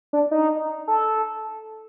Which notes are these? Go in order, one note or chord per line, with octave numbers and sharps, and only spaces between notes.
D4
D#4
A4